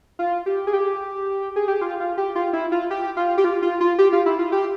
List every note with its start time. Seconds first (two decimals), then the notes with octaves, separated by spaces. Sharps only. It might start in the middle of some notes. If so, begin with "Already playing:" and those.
0.19 F4
0.46 G4
0.67 G#4
0.73 G4
1.56 G#4
1.68 G4
1.81 F4
2.00 F4
2.17 G4
2.35 F4
2.53 E4
2.72 F4
2.91 G4
3.17 F4
3.38 G4
3.44 F4
3.62 F4
3.81 F4
3.98 G4
4.13 F4
4.26 E4
4.39 F4
4.52 G4